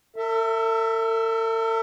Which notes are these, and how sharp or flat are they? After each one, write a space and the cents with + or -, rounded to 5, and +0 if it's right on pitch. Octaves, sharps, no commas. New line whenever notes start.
A4 +45 E5 +5